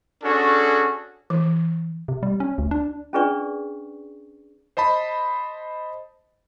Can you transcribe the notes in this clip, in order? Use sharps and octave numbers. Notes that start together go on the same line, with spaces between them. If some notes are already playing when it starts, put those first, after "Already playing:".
C#4 D4 F#4 G#4 A4
E3
C3
G3
C#4
D2
D4
C#4 D4 G#4 B4 D5 C#6
C5 D#5 A5 B5